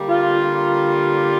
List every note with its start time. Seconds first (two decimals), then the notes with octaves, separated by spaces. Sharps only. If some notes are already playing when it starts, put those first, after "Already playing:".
Already playing: D3 G3 A#3
0.09 F4